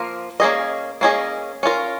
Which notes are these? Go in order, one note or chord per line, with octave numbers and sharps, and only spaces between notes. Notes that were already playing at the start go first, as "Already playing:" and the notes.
Already playing: F3 A#3 F4 A#4
A#3 C#4 G#4 D#5
A#3 C#4 G#4 D#5
C#4 F4 A#4